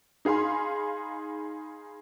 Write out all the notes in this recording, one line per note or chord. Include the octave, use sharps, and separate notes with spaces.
D#4 G#4 F5 B5 C6